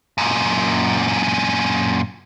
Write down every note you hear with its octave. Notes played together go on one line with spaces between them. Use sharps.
F#2 A#2